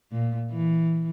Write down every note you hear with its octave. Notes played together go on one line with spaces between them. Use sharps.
A#2
E3